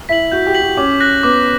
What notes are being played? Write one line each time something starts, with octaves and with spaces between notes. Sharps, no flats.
E4 B6 F#7
F#4 G6
G4
B6 F#7
F#4
C#4 D6
F#6 A#6
B3 D6